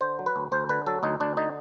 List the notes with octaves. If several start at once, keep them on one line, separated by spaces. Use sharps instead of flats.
D3 C5
F#3
B4
D2
D2 C5
D3 B4
F#3 A4
D2 D#4
D2 D4
D3 D#4